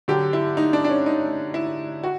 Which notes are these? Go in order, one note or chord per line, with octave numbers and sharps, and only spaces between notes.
D3 F#3 G4
E4
D#4
D4
D4
C#4
D#4
E4
F#4